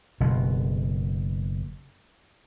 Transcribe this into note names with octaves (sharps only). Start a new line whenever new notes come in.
F#1 B2